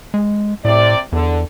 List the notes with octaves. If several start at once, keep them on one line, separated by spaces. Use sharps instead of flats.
G#3
A2 C3 D5
E2 D3